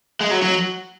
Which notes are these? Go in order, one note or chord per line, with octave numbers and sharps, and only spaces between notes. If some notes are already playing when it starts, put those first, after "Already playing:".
G#3
F#3
F#3